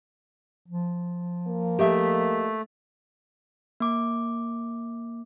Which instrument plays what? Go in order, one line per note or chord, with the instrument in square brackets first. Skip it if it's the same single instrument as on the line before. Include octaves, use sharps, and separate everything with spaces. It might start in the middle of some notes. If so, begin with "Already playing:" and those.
[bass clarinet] F3
[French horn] A#3
[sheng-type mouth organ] A3 [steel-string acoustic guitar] G4 D#5 E5
[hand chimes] A#3 D6